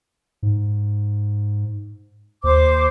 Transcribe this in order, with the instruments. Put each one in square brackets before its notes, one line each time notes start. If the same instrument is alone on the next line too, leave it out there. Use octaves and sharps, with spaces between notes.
[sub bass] G#2
[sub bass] D#2 [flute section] C5 D6